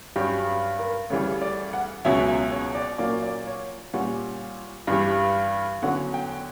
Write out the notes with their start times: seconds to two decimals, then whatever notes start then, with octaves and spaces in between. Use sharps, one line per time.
0.16 G2 F#3 C#4 G4
0.47 G4
0.79 A#4
1.10 D2 C#3 E3 G3 C#5
1.41 D5
1.73 F#5
2.05 C#2 B2 F#3 C#4 E5
2.28 E5
2.52 C#5
2.75 D5
2.98 A#2 F#3 A#3 C#4 D5
3.23 D5
3.47 C#5
3.93 A#2 G3 C#4 F#5
4.87 G2 E3 G3
5.82 E2 D3 F#3 C#4 F#5
6.14 G5